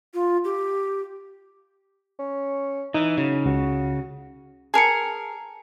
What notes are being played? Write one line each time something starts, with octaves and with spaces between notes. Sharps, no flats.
F4
G4
C#4
E3 D#4
C#3 F#3
C#2 F#4
G#4 A#4 A5 C#7